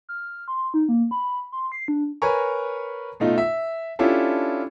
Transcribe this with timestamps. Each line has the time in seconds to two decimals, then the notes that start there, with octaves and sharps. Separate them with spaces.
0.09 F6
0.48 C6
0.74 D#4
0.89 A#3
1.11 B5
1.52 C6
1.72 C7
1.88 D4
2.22 A#4 B4 C#5 G#5 A#5 C#6
3.20 B2 A3 D#4 F4
3.38 E5
3.99 C#4 D4 E4 F4 G4 A4